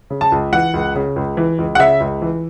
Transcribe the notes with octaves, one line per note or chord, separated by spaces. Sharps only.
C#3
A5
C#2
E3 F#5
C#2
C#3
C#2
E3
C#2
F#5
C#3 E5
C#2
E3